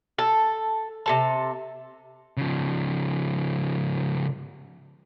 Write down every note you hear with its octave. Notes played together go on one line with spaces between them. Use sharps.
A4
C3 A4 A5
C#3 F3